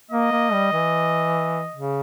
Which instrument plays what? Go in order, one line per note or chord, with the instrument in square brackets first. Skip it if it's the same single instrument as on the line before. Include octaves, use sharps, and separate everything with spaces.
[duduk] A#3 [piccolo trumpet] D#5
[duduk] A#3
G3
E3
C#3